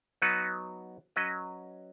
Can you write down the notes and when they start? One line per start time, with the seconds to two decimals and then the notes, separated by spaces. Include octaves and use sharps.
0.22 F#3 B3 D#4 F#4 B4
1.16 F#3 C#4 B4 D#5